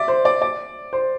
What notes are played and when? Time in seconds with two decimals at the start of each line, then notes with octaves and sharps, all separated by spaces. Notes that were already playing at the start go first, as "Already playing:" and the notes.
Already playing: D5 E5
0.08 C5
0.25 D5
0.42 D5
0.93 C5